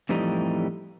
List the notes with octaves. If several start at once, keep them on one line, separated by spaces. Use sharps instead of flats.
F2 A2 E3 G3 D#4